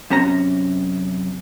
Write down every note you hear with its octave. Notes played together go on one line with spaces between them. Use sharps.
F#2 C3 C#4 A#5